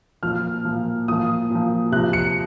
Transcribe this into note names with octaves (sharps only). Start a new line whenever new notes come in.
A#2 F3 F6
A#2 F3
A#2 F3 D#6
A#2
F3
C3 F3 F#6
C#7